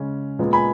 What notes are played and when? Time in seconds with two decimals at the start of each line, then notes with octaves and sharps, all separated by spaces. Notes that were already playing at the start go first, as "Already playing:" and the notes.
Already playing: C#3 G#3 C#4
0.39 A#2 G#3 B3
0.53 G#5 B5